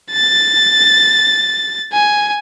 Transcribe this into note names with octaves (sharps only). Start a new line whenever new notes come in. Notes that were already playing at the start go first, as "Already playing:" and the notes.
A6
G#5